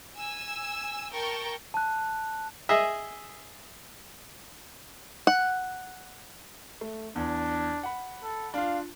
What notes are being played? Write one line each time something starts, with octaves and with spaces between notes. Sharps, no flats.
G#5 E6
A#4 G5 A5 C#6
A5 F#6
G#4 D#5 E5
F#5
A3
E2 D4
F#5 B5
A4
D4 F4 F5